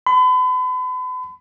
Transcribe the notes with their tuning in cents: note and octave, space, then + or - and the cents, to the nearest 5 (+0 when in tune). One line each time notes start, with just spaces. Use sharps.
B5 +40